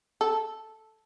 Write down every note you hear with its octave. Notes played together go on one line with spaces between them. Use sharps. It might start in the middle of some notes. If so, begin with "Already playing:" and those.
A4